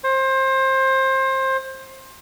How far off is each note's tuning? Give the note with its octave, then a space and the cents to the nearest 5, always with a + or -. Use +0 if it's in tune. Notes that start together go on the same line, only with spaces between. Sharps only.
C5 +25